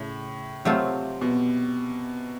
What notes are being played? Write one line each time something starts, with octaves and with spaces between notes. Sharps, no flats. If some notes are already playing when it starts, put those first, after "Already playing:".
Already playing: A2 C#3 A3
C3 F#3 A3 C4 F4
B2